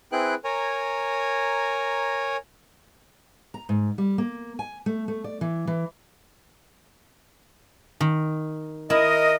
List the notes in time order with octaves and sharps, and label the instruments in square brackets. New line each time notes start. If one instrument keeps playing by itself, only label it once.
[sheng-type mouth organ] C4 E4 G#4 B4 G5 F#6
A#4 C#5 G#5 A#5
[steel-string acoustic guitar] A#5
G#2
G3
A#3
G#5
A3
A3
D5
E3
E3
[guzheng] D#3
[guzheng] E4 [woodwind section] A#4 D#5